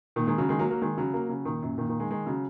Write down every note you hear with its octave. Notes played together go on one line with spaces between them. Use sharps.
A#2 D#3
D#3 G#3
C#3 F#3
D#3 G#3
F#3 A#3
F#3 A#3
D#3 G#3
C#3 F#3
F#3 A#3
C#3 F#3
A#2 D#3
F#2 A#2
A#2 D#3
A#2 D#3
D#3 G#3
D#3 G#3
C#3 F#3